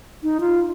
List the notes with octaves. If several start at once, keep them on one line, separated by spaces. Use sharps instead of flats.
D#4
F4